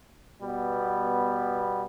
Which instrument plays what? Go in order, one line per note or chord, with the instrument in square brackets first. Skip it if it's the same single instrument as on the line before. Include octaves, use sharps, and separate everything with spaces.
[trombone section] B2 G3 B3